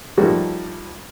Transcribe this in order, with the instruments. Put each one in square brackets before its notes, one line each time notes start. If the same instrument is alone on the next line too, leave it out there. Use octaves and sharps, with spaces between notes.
[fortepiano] F3 G3 A3 A#3 D#4 F#4